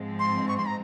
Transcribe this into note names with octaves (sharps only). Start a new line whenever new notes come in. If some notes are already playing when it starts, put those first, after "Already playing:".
Already playing: G#2 F3 G#3 C4
C6
C#6
C6
A#5